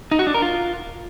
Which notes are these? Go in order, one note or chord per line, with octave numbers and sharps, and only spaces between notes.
D#4
F#4
D4
A#4
F4